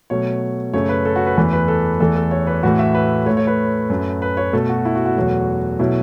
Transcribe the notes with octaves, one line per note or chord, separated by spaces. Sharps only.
B2 F#3 A3 C#5
F#2 C#3 A3 C#5
B4
A4
F#4
B4
E2 E3 A3 B4
B4
A4
E2 E3 A3 A4
A4
C#5
B4
A2 E3 A3 F#4
E5
B4
A2 A3 C#5
C#5
B4
F#2 F#3 A3
B4
C#5
B2 A3 A4
F#4
E4
F#4
F#4
E2 B2 F#3 A3
B2 F#3 A3 E4